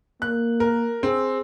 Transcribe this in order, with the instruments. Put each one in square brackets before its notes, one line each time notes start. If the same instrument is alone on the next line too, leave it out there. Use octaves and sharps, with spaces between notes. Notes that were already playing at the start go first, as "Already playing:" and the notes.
[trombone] A#3 [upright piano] F#6
[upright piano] A#4
[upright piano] C4 [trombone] G#4